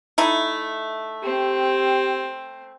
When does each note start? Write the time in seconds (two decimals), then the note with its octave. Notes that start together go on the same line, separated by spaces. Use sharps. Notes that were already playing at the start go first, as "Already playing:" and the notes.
0.18 A3 D#4 E4
1.24 C4 G4